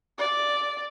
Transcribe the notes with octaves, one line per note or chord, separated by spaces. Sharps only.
D5